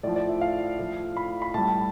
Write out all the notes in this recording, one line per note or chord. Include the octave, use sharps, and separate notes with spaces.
A2 F3 D5
D5
E5
F5
A2 F3
B5
B5
A2 G3 A5